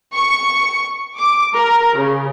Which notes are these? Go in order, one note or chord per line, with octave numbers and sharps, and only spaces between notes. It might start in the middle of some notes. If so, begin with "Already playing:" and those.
C#6
D6
A#4
C#3